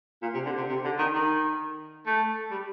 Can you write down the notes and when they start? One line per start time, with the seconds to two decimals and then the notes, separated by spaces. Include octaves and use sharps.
0.22 A#2
0.34 C3
0.45 D3
0.57 C3
0.69 C3
0.84 D3
0.98 D#3
1.14 D#3
2.06 A3
2.51 G3